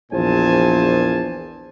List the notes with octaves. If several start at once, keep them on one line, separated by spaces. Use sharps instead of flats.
A#1 E2 A#2 C5 G#5 A5